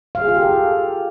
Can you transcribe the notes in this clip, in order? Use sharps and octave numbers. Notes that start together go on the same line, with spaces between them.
F5
G#4
F4
G4
A4